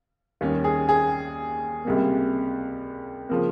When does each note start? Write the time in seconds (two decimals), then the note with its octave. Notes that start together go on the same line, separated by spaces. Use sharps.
0.41 D#2 D#3 G3 C#4
0.64 G#4
0.89 G#4
1.85 C#2 C3 G3 A#3
3.29 C#3 F3 A#3